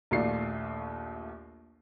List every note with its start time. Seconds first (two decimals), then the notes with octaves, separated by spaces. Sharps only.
0.11 A#1 D#2 A3 F4 D5 C7